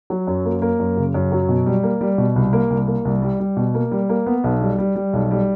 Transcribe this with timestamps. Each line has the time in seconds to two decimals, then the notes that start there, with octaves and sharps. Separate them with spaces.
0.10 F#3
0.27 F#2
0.45 A#3
0.62 A#3
0.79 F#2
0.97 C#3
1.14 F#2
1.32 F#3
1.49 B2
1.66 G3
1.83 A#3
2.01 G3
2.18 B2
2.36 C2
2.53 A#3
2.70 C2
2.87 A#3
3.05 C2
3.22 G3
3.40 G3
3.57 B2
3.74 A#3
3.91 G3
4.09 A#3
4.26 B3
4.44 B1
4.61 G3
4.79 G3
4.96 G3
5.13 B1
5.31 G3